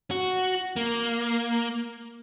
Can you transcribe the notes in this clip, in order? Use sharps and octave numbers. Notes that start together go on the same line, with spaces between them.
F#4
A#3